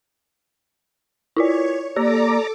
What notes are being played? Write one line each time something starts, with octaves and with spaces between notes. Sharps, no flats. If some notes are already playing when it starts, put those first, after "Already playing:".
E4 F4 C#5 D5
A#3 G4 A4 D5 A#5 D6